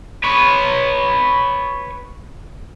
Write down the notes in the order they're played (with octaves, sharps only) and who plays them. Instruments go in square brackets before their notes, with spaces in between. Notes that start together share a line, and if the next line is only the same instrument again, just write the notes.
[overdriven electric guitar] B4 C#5